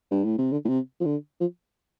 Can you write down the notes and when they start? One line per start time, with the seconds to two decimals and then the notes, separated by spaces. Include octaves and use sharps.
0.11 G2
0.24 A2
0.38 C3
0.52 D3
0.65 A2
0.69 C3
1.00 F3
1.05 D3
1.40 F3